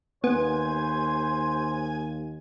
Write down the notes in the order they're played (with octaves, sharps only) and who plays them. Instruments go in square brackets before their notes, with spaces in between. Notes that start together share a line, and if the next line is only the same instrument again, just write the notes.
[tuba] D#2 [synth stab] B3 [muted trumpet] C5 [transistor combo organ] G#5